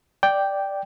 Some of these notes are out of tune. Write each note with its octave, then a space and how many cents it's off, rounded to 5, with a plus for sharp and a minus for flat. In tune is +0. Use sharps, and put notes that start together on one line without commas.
D5 +0 G5 +0